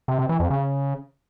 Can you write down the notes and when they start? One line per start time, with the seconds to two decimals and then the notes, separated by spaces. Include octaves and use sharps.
0.08 C3
0.19 C3
0.29 E3
0.40 F2
0.50 C#3